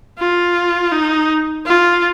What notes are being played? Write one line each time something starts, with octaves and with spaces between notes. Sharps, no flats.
F4
D#4
F4